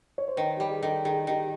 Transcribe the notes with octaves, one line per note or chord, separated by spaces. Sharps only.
C#5
C5
D#3 B4
G3 G4
G#4
D#3 A4
D#3 G#4
D#3 G4